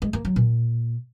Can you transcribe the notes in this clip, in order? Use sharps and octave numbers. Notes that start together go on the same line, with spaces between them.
G#3
A#3
F#3
A#2